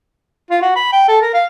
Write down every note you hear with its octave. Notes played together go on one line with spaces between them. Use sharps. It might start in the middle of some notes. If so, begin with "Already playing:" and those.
F4
F#4
B5
G5
A4
A#4
F5